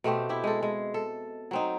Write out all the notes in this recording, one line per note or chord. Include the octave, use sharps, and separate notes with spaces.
B2 A3 C4 G4
E4 G4
G#3 A4
G#3
A4
F#3 C4 D#4